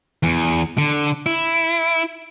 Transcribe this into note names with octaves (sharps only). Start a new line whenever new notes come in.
E2
D3
E4